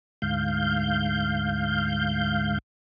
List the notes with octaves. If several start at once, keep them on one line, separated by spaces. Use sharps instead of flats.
D2 G#2 F5 G6